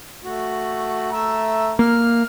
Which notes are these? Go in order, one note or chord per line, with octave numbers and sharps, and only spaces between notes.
A3 F#4
A3 E5 A#5
A#3 F6